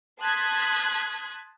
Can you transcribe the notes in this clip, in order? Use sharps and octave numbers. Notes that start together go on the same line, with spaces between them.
A5 C6 D#6 F#6 G#6 B6